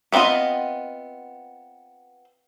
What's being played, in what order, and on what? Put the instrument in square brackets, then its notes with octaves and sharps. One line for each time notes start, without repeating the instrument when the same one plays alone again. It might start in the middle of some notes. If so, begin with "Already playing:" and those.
[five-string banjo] B3 C4 E4 F4 D#5